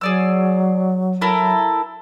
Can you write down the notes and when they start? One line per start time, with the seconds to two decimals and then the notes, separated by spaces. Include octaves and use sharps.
0.01 F#3 G#4 D5 E6
1.21 E4 A4 A#4